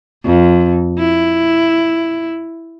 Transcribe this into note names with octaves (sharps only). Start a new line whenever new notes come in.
F2
E4